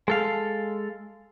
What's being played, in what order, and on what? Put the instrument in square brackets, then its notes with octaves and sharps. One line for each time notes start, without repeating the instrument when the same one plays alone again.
[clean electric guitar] G#3 A4 F5